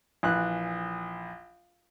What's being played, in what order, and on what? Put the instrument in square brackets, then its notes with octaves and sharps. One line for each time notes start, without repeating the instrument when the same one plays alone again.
[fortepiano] A#1 E3 F#6